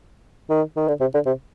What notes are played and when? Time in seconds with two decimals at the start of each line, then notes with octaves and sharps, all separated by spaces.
0.50 D#3
0.76 D#3
0.88 D3
1.00 C3
1.14 D3
1.26 C3